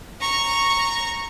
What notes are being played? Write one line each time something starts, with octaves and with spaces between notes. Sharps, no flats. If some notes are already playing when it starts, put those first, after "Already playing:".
A#5 C#6